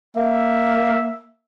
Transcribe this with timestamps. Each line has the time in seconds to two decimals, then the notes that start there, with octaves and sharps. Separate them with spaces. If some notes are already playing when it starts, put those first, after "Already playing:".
0.16 A#3 E5